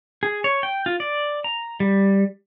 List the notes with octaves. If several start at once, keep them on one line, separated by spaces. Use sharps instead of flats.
G#4
C#5
G5
F4
D5
A#5
G3